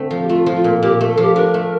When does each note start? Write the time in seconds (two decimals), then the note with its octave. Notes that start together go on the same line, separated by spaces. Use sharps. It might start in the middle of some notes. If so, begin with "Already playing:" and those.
Already playing: D3 A3 C4
0.11 F3
0.23 G4
0.28 A3 F4
0.46 F3
0.55 F4
0.64 A#2
0.82 A#2 G4
1.01 A3
1.10 A4
1.17 F3
1.23 G4
1.36 D4 A#4
1.54 A3